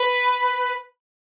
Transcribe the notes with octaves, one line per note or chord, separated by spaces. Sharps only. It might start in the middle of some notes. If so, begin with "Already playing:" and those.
Already playing: B4